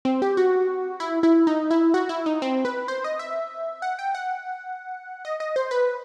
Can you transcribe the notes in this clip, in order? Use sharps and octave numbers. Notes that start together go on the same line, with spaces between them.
C4
G4
F#4
E4
E4
D#4
E4
F#4
E4
D#4
C4
B4
C5
D#5
E5
F#5
G5
F#5
D#5
D#5
C5
B4